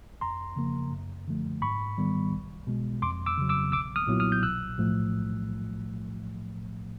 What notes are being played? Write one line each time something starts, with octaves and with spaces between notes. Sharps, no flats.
F2 A#5 C6
C#3 F3 A#3
F#2
D3 F3 A3
G#2 B5 C#6
D#3 G3 B3
B1
B2 G#3
F2 C6 D6
D6 E6
C#3 F#3
D6 E6
B1 D6 E6
D#6 F6
A#2 F#3 B3 E4
D#6 F6
G6
B1 E6 F#6
A2 F3 A3